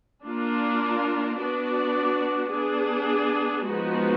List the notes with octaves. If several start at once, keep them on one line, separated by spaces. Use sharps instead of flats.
A#3 D4 F4 A#4
B3 D4 F#4 D5
B3 D4 G#4
F3 G#3 B3 D#4 F#4